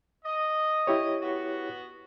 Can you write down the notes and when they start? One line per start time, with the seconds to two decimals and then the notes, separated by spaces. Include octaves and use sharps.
0.25 D#5
0.87 E4 G4 C#5
1.22 B3 F#4